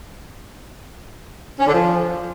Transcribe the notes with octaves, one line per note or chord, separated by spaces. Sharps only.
C#4
D3
F3